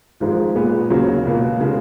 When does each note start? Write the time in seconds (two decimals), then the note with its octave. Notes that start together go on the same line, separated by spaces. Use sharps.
0.20 G#1 G#2 F3 G#3
0.55 A#2 G#3 B3
0.90 D#2 C#3 F#3 C#4 F#4
1.25 C#2 B2 A#3
1.60 C#3 G#3